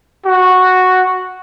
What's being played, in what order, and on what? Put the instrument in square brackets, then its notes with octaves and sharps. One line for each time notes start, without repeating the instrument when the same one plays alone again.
[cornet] F#4